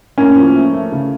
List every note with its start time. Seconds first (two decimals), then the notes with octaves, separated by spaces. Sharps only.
0.18 A2 A#3 C#4
0.36 F3
0.56 A3
0.74 A3
0.92 C#3